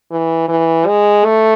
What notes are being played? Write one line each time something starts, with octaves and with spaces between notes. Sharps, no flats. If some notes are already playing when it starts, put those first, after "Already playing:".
E3
E3
G#3
A3